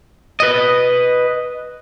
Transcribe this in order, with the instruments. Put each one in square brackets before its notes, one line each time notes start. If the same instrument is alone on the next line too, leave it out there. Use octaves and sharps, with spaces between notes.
[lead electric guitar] B4 D#5